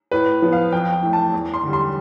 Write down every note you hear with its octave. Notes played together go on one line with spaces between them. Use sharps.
A2 B4
F3 B3
F5
F2 G5
G5
E3 A3
A5
E2
C6
D3 G3
C6